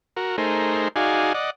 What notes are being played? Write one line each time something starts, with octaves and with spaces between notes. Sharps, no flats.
F#4 A#4
A3 D#4 G#4 A#4 C5
D#4 F#4 G#4 D5 F5 G#5
D5 D#5 F#5